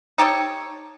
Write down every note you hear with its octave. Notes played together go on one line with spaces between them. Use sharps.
D#4 G4 A4 C#5